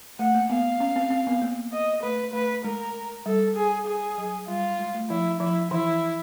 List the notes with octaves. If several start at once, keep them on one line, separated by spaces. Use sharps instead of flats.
A3 F#5
A#3
B3 F5
C#4
C4
C4
B3
A#3
D#5
A3 B4
A3 B4
G#3 A#4
G3 A4
G#4
G#4
F#3
G3 F4
G#3
A3
F3 E4
F3 E4
E3 E4